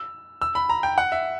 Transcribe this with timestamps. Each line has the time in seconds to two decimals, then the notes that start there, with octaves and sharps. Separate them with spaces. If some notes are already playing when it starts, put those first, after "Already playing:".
Already playing: E6
0.42 E6
0.55 B5
0.69 A#5
0.83 G5
0.98 F#5
1.12 E5